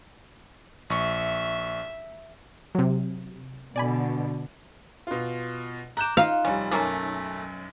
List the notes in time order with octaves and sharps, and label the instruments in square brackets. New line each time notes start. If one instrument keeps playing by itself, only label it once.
[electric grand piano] A#1 C#6 [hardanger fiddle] E5
[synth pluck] C3 F#3
[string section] B2 D3 [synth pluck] D5 G#5 B5
[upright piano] B2 F4
[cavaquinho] A#5 D6 [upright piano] F#6 G6 E7
[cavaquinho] D#4 F4 [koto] F5
[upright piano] F1 G3 [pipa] C#4
[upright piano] B1 F#2 [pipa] A3 A#3 C#4